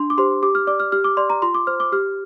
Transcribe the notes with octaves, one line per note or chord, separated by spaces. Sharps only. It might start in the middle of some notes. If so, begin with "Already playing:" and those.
Already playing: D4 C6
D6
G4 C5 C6
G4 D6
F6
D5 D6
F6
G4 F6
D6
D5 C6
A#5
F4 C6
D6
C5 F6
D6
G4 F6